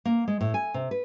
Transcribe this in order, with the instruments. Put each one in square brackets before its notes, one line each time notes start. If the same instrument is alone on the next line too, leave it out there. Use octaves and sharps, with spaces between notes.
[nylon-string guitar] A#3
G#3
A2
G#5
C3
B4